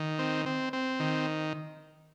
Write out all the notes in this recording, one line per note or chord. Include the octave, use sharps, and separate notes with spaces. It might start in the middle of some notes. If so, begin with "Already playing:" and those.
Already playing: D#3
C4
C4
C4
D#3